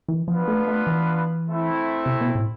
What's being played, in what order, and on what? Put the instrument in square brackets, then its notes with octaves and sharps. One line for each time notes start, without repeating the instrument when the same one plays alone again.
[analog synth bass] E3
[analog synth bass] F3 [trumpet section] B3 D4 F4 B4 F5
[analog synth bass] A3
A3
E3
[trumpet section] A3 C4 E4
[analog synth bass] C3
B2
A2